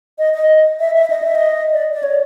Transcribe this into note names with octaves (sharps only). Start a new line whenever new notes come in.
D#5
D#5
E5
E5
D#5
E5
D#5
D5
D5
C#5